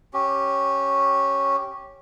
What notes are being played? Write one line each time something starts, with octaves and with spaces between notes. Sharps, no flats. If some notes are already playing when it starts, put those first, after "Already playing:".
C#4 G4